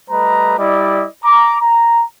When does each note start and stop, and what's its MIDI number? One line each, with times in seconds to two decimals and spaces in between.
0.10 0.56 55
0.10 0.56 57
0.10 0.56 71
0.10 0.56 75
0.10 0.56 82
0.58 1.07 55
0.58 1.07 64
0.58 1.07 74
0.58 1.07 75
1.24 1.57 82
1.24 1.57 86
1.62 2.03 82